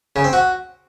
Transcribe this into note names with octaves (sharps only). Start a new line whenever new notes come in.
C#3
C4
F#4